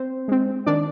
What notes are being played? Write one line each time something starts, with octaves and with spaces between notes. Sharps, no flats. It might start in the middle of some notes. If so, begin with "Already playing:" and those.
Already playing: C4 C5
G#3 C4
D#3 D4 D5